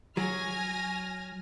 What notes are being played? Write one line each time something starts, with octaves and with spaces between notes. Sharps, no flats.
F#3 G#5 F6 A#6